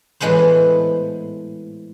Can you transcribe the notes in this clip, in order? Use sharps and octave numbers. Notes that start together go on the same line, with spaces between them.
A2 E3 G#3 B3 C5